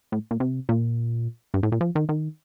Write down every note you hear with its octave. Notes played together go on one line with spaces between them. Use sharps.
A2
A#2
C3
A#2
G2
A2
A#2
F3
D#3
D#3